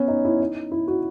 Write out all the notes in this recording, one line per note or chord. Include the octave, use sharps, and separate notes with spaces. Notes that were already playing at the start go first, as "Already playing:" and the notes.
Already playing: B3 C#4
D#4
E4
D#4
E4
F#4